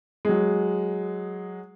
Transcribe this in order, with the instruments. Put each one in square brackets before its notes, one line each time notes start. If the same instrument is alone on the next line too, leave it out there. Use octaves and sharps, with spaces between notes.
[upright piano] F#3 G#3